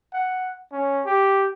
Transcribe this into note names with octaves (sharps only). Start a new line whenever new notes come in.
F#5
C#4
G4